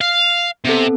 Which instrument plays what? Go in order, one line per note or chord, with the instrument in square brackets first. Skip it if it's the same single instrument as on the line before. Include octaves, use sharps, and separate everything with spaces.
[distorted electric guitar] F5
[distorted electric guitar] C3 [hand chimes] B3 C4 A4